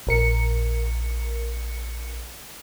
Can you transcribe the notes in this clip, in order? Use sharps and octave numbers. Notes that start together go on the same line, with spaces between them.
A#1 A#4 C#7